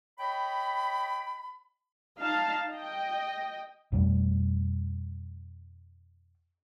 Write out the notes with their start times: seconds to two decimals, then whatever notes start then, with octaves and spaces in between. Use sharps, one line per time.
0.19 C#5 D#5 G5 B5
2.18 D#4 F5 A5
2.72 D#5 G5
3.92 F2 B2 G3 A3